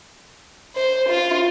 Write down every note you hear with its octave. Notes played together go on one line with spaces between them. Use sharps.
C5
F4